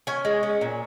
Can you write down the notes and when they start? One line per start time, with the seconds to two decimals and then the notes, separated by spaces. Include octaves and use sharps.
0.07 C#4 G#5
0.25 G#3
0.43 C#4
0.61 A#2